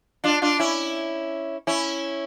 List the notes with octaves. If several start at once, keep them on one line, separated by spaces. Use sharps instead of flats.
D4 F4
D4 F4
C#4 E4
C#4 E4